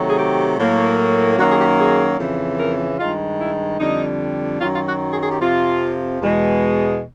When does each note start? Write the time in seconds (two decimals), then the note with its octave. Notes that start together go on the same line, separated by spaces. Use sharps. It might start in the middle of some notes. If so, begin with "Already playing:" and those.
Already playing: C3 D#3 F#3 A3
0.08 G#4
0.17 G4
0.58 A2 F#3 A#3
1.38 F#2 D#3 F#3 A#3 F#4
1.48 G#4
1.58 G4
1.79 G#4
2.18 F2 C#3 E3
2.59 A#4
2.99 G2 D#3 G#3 F4
3.39 E4
3.80 F2 D3 G3 D#4
4.60 F#2 D#3 F#3 F4
4.74 F4
4.87 F#4
5.10 G#4
5.21 G#4
5.31 G4
5.41 F2 C3 F3 F4
6.21 E2 B2 G#3